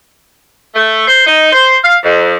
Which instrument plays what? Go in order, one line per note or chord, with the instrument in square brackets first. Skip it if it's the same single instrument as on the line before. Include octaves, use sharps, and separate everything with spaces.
[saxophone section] A3
C5
D#4
C5
F5
F2